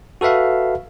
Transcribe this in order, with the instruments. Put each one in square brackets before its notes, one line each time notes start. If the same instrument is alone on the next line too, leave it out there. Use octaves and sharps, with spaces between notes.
[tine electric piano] F#4 A4 B4 E5 F5